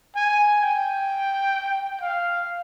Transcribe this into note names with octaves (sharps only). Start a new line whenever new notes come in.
G#5
G5
F5